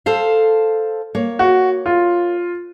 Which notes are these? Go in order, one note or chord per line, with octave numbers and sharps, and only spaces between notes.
A4 C5 F5
A#3 C#5
F#4
F4